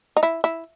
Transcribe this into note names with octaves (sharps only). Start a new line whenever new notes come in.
D#4
E4
E4